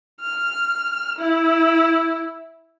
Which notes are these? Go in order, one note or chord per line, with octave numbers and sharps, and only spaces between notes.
F6
E4